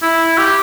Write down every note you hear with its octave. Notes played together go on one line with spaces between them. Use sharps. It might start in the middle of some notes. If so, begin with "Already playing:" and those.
E4
G4